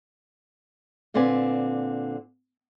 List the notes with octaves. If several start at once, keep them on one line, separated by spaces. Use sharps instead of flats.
A#2 D3 C4 B4 D5 G#5